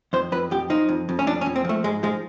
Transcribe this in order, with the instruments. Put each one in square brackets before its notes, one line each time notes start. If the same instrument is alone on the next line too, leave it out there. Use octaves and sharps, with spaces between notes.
[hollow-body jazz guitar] F2 C5
F2 B4
F2 G4
F3 D#4
F2
F2
C#4
F2 D4
C#4
F2
C4
F3 A3
G#2 G#3
F3 G#3